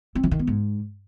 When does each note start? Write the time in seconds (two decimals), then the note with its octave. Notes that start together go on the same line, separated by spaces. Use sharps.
0.15 C4
0.23 E3
0.31 D#3
0.39 B3
0.47 G#2